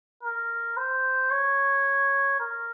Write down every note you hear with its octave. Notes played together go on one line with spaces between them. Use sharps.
A#4
C5
C#5
A#4